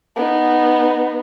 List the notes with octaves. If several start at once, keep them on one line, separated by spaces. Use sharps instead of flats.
B3 D#4